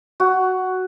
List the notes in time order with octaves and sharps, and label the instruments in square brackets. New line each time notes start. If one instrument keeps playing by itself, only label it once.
[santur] F#4